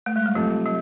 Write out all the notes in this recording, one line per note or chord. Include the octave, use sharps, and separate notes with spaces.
A3
G#3
G3
C3 F3 F#3 A3
F#3